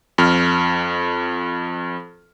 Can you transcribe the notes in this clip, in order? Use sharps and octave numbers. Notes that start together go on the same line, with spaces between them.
F2 F6